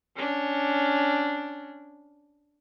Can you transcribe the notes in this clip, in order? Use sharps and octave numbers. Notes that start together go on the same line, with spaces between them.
C#4 D4